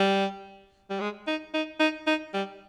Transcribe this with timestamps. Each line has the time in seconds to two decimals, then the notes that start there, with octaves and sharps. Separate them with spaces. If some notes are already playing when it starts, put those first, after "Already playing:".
Already playing: G3
0.90 G3
1.00 G#3
1.27 D#4
1.54 D#4
1.80 D#4
2.07 D#4
2.34 G3